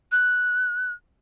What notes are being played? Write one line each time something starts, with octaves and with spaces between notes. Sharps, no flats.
F#6